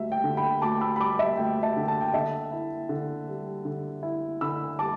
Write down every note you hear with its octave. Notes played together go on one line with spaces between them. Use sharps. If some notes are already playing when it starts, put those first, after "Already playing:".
Already playing: D2 G3 E5
G5
D3
G5 B5
D2 A5 D6
B5 E6
B5
G3 A5 D6
E5
D2 G5
E5 A5
D3
A5
G5
D3 E5 A5
E4
D3
G3
D3
E4
D3 B5 E6
G3 A5 D6